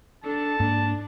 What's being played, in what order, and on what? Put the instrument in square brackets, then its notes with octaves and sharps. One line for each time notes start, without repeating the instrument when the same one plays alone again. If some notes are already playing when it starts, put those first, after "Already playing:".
[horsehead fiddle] D4 A4 [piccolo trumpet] A5
[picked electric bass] G#2 A#3 [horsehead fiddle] D4